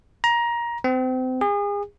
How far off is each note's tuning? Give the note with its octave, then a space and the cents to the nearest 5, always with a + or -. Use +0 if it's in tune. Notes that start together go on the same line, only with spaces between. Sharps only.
A#5 +20
C4 -30
G#4 -35